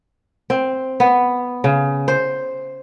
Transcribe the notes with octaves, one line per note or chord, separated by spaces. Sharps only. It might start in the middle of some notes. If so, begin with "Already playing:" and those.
C4
B3
C#3
C5